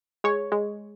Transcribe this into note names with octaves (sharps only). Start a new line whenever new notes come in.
G#3 C#5
G#3